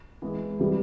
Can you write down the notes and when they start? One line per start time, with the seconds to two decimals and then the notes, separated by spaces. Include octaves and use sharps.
0.22 E3 G#3
0.59 C3 E3 G3